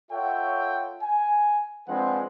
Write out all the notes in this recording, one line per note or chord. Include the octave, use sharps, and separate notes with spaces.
F4 A4 C#5 E5 F#5 G5
G#5
F3 G#3 C4 D4 B4 F#5